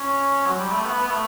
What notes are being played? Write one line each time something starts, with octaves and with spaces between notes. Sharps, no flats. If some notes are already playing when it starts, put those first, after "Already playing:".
Already playing: C#4
F#3
G3
A3
B3
B3
A3